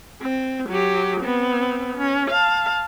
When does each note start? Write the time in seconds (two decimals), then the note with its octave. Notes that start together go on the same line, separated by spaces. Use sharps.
0.22 C4
0.69 F#3 G4
1.20 B3 C4
1.98 C#4
2.30 F5 A5